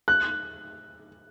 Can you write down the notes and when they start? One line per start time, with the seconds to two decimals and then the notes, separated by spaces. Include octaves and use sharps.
0.08 F#6